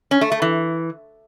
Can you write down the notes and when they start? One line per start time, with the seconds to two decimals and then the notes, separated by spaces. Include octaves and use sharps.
0.11 C#4
0.21 A3
0.32 A3
0.42 E3